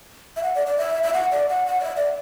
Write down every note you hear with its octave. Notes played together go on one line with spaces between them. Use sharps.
E5
F#5
D5
D5
E5
E5
F#5
D5
F#5
F#5
D5
E5
D5